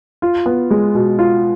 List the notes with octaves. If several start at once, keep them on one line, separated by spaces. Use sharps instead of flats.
F4
B3
G#3
B2
F4